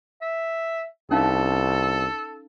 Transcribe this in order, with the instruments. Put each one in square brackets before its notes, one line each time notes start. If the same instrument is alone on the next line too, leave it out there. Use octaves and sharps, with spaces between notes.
[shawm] E5
[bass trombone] C2 [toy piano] C#4 D#4 F5 [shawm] A4